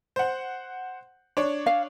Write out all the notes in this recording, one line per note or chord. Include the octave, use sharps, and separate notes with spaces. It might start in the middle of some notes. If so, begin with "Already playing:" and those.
C5 F#5
D4 C#5
F5